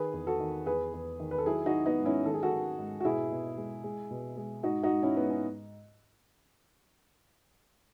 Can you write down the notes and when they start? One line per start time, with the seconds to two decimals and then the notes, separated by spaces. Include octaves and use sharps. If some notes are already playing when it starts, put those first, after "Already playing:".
Already playing: D#3 G#4 B4
0.14 E2
0.27 F#4 A4
0.40 D#3
0.66 E2 G#4 B4
0.94 E2
1.20 D#3
1.31 B4
1.38 A4
1.46 F#3 E4 G#4
1.66 D#4 F#4
1.72 F#3
1.86 B3 D#4
1.99 G#2
2.05 C#4 E4
2.25 D#3 A4
2.34 G#4
2.43 F#4 A4
2.52 D#3
2.78 G#2
3.00 F#4
3.05 B2 E4 G#4
3.31 B2
3.57 G#3
3.84 G#3
4.11 B2
4.37 G#3
4.63 G#2 D#4 F#4
4.83 D#4 F#4
4.90 G#2
5.03 C#4 E4
5.17 G#2 B3
5.30 C#4